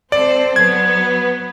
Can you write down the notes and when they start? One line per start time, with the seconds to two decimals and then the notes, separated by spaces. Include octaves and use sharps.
0.12 C4 A4 C5 D5
0.56 F#3 B3 G#6